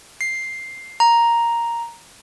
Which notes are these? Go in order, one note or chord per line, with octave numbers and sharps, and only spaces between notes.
C7
A#5